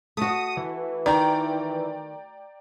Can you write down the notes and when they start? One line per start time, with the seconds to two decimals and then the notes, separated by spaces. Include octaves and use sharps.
0.17 A3 F#4 D#6
0.57 E3
1.06 D#3 D5 G5 A#5